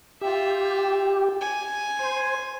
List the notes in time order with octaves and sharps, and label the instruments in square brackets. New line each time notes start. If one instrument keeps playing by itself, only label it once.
[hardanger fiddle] F4 E5 [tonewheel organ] G4
[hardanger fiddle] G#5
[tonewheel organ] C5